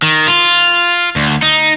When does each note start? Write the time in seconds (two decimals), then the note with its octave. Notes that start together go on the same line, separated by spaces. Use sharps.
0.02 D#3
0.27 F4
1.16 D2
1.42 D#4